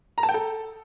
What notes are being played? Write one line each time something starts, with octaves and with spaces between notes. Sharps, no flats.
A#5
A5
G5
A4